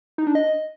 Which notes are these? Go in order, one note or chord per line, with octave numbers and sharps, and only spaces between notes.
D#4
D4
D#5